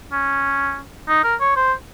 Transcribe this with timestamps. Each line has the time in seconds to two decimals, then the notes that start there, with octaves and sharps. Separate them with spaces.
0.12 C#4
1.08 D#4
1.24 A#4
1.40 C#5
1.56 C5